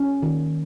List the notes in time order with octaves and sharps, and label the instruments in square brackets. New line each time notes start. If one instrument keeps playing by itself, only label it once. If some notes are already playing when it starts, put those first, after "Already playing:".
Already playing: [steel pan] C#4
D#3